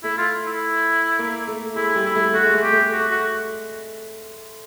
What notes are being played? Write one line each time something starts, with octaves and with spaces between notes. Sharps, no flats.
A3 E4
F4
E4
A#3
A3
G#3 E4
G3
E4
A3
A3 F#4
G#3
A3
G4
A3
F#4
F#4